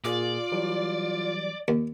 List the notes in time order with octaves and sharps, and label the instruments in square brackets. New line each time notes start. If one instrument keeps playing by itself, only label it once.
[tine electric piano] A#2 A#3 G#4 [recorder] F4 [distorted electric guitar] D5
[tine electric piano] E3 F#3 G3
[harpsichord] D#2